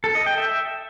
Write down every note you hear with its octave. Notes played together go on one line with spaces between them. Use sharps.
A4
D#5
G5
E5